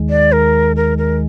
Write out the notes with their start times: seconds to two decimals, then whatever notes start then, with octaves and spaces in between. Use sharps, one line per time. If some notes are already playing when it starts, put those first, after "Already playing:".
Already playing: D#2 D#3 G#3
0.10 D5
0.32 A#4
0.76 A#4
0.98 A#4